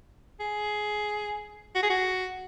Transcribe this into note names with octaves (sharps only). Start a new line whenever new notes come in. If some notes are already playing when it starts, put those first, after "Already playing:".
G#4
F#4
G#4
F#4